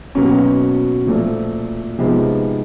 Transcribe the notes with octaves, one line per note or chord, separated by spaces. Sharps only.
B2 F#3 A#3 C#4
A#2 F3 A3
C3 F3 G#3 B3 D#4